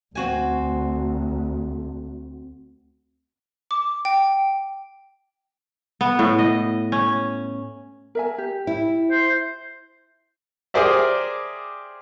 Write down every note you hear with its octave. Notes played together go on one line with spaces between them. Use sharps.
D2 C4 F#4 G#5
D6
G5
B3
A2
D#5
C#4
A#4 E5 G#5
G4
E4
C5
G4 G#4 A#4 C5 D5 E5